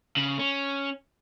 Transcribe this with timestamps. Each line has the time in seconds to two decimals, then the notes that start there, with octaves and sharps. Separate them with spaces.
0.17 C#3
0.39 C#4